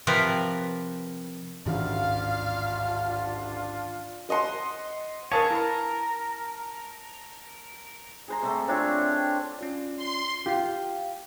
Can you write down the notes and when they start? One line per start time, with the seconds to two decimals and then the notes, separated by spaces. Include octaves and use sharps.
0.07 C3 F3 A#4 B4
1.66 A1 D2 G#2 D#3 E3 D4 F4 F5
4.29 C5 D#5 F#5 C6
5.32 D4 G#4 A#4 B4 C#5 F5 A5 A6
5.51 E4 A#4 B5
8.28 G#4 C5 A#5
8.42 C3 A3
8.68 C4 D4 F4 C#5
9.59 C#4 F4 D5
9.96 C6
10.46 F4 G4